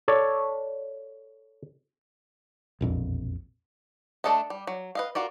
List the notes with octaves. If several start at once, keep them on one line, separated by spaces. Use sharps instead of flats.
A4 C#5 D5
E1 A#1 F2
A3 D4 A4 D#5 A5
G3
F#3
B4 D#5 F5
F4 F#4 A#4 D5